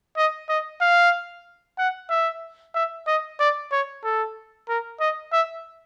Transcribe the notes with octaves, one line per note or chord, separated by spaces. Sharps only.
D#5
D#5
F5
F#5
E5
E5
D#5
D5
C#5
A4
A#4
D#5
E5